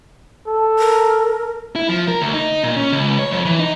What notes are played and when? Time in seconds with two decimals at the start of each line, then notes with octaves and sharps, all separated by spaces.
0.47 A4
0.79 A#4
1.75 E4
1.89 F3
2.08 A#4
2.22 D2
2.33 D#4
2.64 A#2
2.77 C#4
2.92 C#2
3.19 C#5
3.31 F2
3.45 E3
3.59 D#4